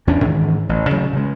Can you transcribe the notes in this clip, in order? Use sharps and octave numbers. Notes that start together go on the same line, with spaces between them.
E2 C#4 D4
G#2 D#3 E3
A1
C#3 F#3 G#3 A3
C#3 G#3